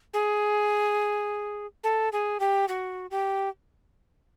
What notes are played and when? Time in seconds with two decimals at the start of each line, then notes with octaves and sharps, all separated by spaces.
0.13 G#4
1.83 A4
2.12 G#4
2.40 G4
2.68 F#4
3.11 G4